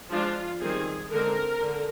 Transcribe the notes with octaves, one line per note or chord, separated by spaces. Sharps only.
F3 G#3 D4 F4
D#3 G3 C4 G#4
D3 G#3 C4 A#4
D3